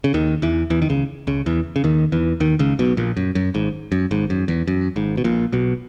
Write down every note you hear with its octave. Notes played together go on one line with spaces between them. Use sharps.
C#3
D#2 D#3
E2 E3
E2 E3
D#3
C#2 C#3
C#2 C#3
E2 E3
C#3
D#2 D#3
E2 E3
D#2 D#3
C#2 C#3
B1 B2
A#1 A#2
F#2
F#2
G#1 G#2
F#2
G#1 G#2
F#2
E2
F#2
G#1 G#2
B2
A#1 A#2
B1 B2